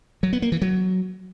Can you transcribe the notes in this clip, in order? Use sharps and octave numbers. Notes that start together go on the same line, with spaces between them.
F#3
B3
A#3
E3
F#3